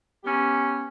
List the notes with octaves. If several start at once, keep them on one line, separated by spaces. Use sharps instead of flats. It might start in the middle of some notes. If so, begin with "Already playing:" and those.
B3 C#4 G4